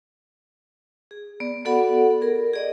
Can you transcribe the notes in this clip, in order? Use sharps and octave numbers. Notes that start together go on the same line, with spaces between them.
G#4
B3 D5
B3 F#4 A4 D5 F#5 B5
G#4 A#4
G#4 D5 D#5